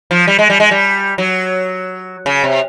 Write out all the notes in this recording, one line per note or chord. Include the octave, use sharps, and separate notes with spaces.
F3
G3
G#3
G3
G#3
G3
F#3
C#3
C3